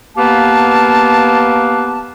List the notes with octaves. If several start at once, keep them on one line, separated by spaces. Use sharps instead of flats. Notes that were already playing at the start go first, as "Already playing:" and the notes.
A#3 B3 G4 B4 F5 A5